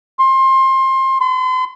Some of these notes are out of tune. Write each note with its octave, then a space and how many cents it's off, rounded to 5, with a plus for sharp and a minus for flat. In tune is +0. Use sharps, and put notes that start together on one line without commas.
C6 +25
C6 -40